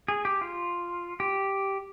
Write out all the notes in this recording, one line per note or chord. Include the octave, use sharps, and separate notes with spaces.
G#4
G4
F4
G4